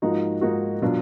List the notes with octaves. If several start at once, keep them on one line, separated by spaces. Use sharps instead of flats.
G#2 F3 A#3 D#4 F#4
G#2 F3 A#3 D#4 F#4
B2 F#3 D4 F4